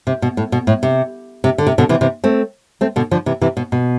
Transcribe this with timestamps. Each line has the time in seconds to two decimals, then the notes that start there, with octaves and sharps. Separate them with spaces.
0.07 C3
0.22 B2
0.37 A2
0.52 B2
0.67 A2
0.83 C3
1.44 C3
1.58 D3
1.67 C3
1.78 B2 D3
1.89 C3 E3
2.01 C3 E3
2.24 A3 C4
2.81 A3 C4
2.96 B2 D3
3.11 D3 F3
3.26 C3 E3
3.41 C3 E3
3.57 B2
3.72 B2